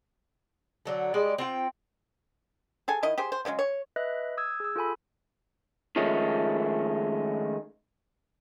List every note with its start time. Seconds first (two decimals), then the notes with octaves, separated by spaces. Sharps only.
0.86 D3 F#3 A3
1.14 G3 G#3 D5 D#5
1.38 C4 F4 G5
2.88 G#4 A4 G#5
3.03 D#3 E4 D#5
3.18 G4 G#4 C5
3.32 C5
3.45 C#3 E3 F#3 G#3
3.59 C#5
3.96 B4 D#5 E5 F#6
4.37 D#6 E6 G#6
4.60 G#4 E6
4.76 F4 A4 G#5 B5
5.96 D#3 F3 G#3 A3 C#4